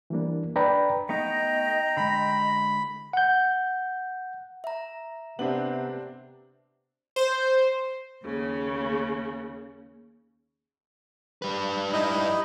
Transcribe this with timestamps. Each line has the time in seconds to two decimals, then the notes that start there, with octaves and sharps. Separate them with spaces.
0.10 E3 G3 A#3 D4
0.56 D4 B4 D5 G5 A#5 B5
1.09 A3 B3 D#4 D#5 G5 A#5
1.97 D3 G#3 B5
3.13 F#5 G6
4.64 E5 A#5
5.39 C3 B3 C4 D4 F#7
7.16 C5
8.23 D#2 C#3
11.42 G3 B4
11.93 D#4 E4 D#5